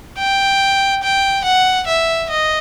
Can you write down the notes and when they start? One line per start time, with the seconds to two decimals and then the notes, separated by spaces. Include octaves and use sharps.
0.18 G5
1.03 G5
1.44 F#5
1.87 E5
2.30 D#5